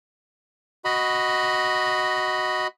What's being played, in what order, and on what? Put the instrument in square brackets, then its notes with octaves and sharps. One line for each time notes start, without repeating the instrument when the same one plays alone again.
[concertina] F#4 D#5 B5